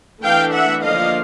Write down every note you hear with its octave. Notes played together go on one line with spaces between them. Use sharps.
E3 A3 D4 F5 G5
E5 F#5
D3 F3 A#3 D4 D#5 F5